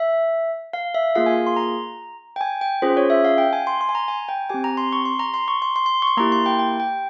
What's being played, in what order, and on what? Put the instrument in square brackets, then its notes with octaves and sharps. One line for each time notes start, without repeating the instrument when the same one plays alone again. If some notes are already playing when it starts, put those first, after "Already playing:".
Already playing: [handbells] E5
F5
E5
A#3 F4 G#4 F5
G#5
C6
A#5
G5
G#5
G5
C#4 F4 G#4 C5
C#5
E5
F5
G5
G#5
C6
C6
G#5
A#5
G#5
G5
C4 G4 G#5
A#5
C6
C#6
C6
A#5
C6
C#6
C6
C6
C6
C#6
C6
A#3 E4 G4 A#5
C6
G5
G5
G5